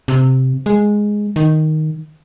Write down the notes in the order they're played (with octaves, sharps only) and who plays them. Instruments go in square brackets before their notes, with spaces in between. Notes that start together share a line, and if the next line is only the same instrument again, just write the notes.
[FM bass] C3
G#3
D#3